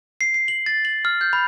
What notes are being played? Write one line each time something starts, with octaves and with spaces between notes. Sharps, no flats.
C7
C7
F#7
A6
F#7
F6
G6
B5